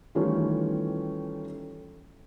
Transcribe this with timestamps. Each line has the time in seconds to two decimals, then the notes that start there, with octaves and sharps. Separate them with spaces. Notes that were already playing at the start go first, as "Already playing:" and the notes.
0.15 D#3 E3 G3 A3 C#4 F4